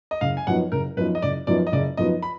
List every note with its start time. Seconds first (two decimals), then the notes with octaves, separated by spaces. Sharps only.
0.11 D#5
0.21 F#1 F5
0.37 G#5
0.47 F#2 F3 B3 D#4 F#5
0.72 F#1 A#4
0.97 F#2 F3 B3 D#4 B4
1.15 D#5
1.22 F#1 D5
1.47 F#2 F3 B3 D#4 D5
1.67 D#5
1.72 F#1 D5
1.97 F#2 F3 B3 D#4 D#5
2.23 B5